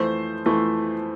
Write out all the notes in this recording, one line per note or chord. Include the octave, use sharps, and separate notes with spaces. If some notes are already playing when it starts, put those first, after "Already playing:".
Already playing: F2 E3 A3 C5
F2 E3 A3